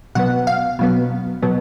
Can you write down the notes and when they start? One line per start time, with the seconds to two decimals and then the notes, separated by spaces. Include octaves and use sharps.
0.15 B2 F#3 B3 F#5
0.47 F5
0.79 B2 F#3 B3
1.42 B2 F#3 B3